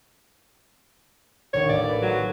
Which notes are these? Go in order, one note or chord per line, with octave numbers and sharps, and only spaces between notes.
A#1 D#2 C#5
A1 D5
B4
F#3
A4